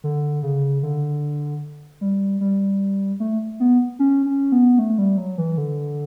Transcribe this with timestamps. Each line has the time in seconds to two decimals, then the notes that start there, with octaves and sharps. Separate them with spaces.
0.04 D3
0.43 C#3
0.83 D3
2.01 G3
2.41 G3
3.20 A3
3.60 B3
3.99 C#4
4.26 C#4
4.52 B3
4.79 A3
4.98 G3
5.18 F#3
5.38 E3
5.58 D3